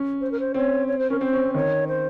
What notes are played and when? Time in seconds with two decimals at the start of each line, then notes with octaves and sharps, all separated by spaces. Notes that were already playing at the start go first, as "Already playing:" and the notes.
Already playing: C#4
0.21 C5
0.32 A#4
0.40 C5
0.54 C4 C#5
0.88 C#5
0.99 C5
1.10 C#4 A#4
1.21 C4 C5
1.33 C#4
1.44 C4
1.54 D#3 C#5
1.88 C5